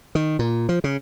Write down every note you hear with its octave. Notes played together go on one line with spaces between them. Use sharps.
D#3
A#2
F3
C#3